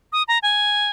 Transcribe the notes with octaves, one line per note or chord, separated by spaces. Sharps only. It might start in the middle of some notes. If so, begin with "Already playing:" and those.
D#6
A#5
G#5